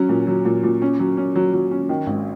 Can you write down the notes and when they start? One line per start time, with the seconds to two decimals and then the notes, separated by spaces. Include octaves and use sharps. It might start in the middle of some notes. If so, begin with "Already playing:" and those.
Already playing: F#3 C#4
0.09 A#2
0.27 F#3
0.45 A#2
0.64 A#2
0.82 C#4
1.00 F#3
1.17 C#4
1.36 F#3
1.54 F#3
1.71 C#4
1.89 D#3
2.07 G#1